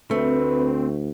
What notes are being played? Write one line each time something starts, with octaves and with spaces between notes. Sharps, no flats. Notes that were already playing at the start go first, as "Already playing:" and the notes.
D2 A3 C4 B4